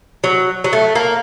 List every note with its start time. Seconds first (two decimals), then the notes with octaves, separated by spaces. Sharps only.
0.24 F#3
0.64 F#3
0.73 A3
0.95 A#3